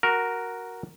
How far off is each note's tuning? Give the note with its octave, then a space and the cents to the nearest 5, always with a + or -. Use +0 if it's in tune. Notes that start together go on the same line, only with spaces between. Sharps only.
F#4 +0 A#4 +0